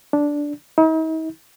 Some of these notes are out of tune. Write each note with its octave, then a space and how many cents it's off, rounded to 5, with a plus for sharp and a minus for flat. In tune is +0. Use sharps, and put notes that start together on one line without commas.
D4 -10
D#4 +45